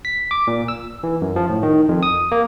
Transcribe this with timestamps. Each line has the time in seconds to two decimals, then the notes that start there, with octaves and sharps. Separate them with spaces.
0.05 B6
0.31 D6
0.47 A#2
0.68 E6
1.03 E3
1.22 F#2
1.36 F3
1.50 A2
1.63 D#3
1.89 F2
2.03 D#6
2.32 A#3